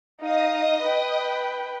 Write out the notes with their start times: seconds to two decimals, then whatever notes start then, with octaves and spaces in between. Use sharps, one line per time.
0.21 D#4 D#5 F5 D#6
0.83 B4 G5